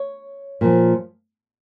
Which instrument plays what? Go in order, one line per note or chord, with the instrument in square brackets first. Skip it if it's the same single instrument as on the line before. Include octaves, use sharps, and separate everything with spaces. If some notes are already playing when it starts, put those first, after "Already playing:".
Already playing: [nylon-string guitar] C#5
A#2 F3